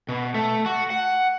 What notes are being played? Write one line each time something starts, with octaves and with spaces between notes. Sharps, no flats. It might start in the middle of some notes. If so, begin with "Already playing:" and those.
B2
A3
F#4
F#5